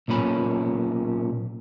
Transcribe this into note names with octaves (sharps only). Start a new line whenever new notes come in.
B1 A#2 C#4 B5